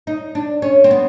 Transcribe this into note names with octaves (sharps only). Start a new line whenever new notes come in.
D#4
D4
C#4
C4
B3